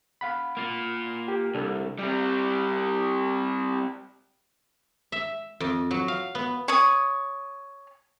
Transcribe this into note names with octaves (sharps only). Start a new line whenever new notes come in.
F5 F#5 B5
A#3 F4
G4
C2 D4 A4
G3 C4
E5
F2
F#3
F5
B3
C#5 D#6